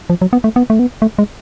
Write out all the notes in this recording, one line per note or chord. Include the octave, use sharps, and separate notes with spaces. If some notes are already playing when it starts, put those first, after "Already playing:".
F3
F#3
B3
A3
B3
A3
B3
A3
G#3